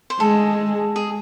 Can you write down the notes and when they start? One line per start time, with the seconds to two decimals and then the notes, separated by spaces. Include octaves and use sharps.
0.10 C5
0.20 G#3 A4
0.96 G#4